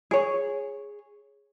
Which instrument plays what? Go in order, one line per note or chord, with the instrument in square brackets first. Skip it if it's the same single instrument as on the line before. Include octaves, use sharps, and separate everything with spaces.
[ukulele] G#4 C#5